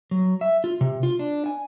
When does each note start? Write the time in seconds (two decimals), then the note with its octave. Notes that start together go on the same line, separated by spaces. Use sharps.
0.11 F#3
0.41 E5
0.64 F4
0.81 C3
1.03 F4
1.19 D4
1.46 G#5